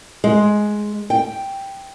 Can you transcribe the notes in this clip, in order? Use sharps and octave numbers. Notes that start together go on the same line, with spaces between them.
G#3
G5